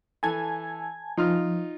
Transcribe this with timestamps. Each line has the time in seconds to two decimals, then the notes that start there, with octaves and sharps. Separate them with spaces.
0.23 E3 A4 G#5 A5 G#6
1.17 F3 D#4 F4 F6